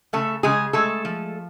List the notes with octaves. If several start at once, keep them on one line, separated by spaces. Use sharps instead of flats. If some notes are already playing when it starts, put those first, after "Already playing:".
C#3 A3 A4
C#3 G#3 G#4
G#3 A3 A4
F3